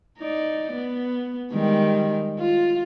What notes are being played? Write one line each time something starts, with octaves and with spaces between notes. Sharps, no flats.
D#4 D5
B3
D#3 G3 G#3
F4